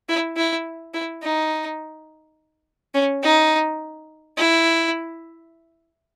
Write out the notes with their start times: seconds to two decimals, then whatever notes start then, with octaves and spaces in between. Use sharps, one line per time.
0.09 E4
0.37 E4
0.94 E4
1.23 D#4
2.94 C#4
3.23 D#4
4.37 E4